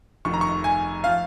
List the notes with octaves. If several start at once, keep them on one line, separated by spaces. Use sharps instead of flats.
F1 F2 D#3 C#6
A#5
C#6
G#5
F3 F5